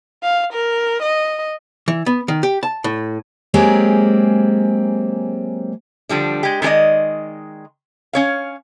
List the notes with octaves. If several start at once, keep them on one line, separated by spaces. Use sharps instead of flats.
F5
A#4
D#5
E3
B3
D#3
G4
A5
A2
F#3 G#3 A#3 C4 G4 G#4
D3 F3 G3 D4
G#3 G4
D#3 G#3 G#4 D5 D#5
C#4 C#5 F5